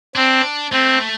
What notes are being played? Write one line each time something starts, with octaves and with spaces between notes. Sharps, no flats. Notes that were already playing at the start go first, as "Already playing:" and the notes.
C4 D4
A3 C4